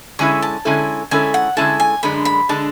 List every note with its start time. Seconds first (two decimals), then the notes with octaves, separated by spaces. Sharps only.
0.19 D3 G#3 C#4 E4 A4 C#6
0.42 A5
0.65 D3 G#3 C#4 E4 A4
1.11 D3 G#3 C#4 E4 A4 G#5
1.34 F#5
1.57 D3 G#3 C#4 E4 A4 A5
1.80 G#5
2.03 F#2 D3 G#3 D4 B5
2.25 B5
2.49 D3 G#3 D4 A5